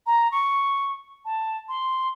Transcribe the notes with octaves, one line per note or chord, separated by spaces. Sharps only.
A#5
C#6
A5
C6